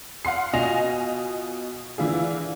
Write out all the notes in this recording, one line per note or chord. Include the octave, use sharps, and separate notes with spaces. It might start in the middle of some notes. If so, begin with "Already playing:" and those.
F5 F#5 C6 C7
B2 F4 D#5 G#5 A#6 F7
D3 E3 E4 F4 G#4